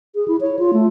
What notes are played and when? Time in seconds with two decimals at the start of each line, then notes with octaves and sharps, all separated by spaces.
0.15 G#4
0.28 E4
0.41 C#5
0.59 F4
0.73 A3